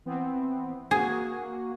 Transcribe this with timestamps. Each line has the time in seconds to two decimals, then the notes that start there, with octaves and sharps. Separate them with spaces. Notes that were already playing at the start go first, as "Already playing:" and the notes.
0.05 E3 B3 C4
0.91 A#3 F#4 G#4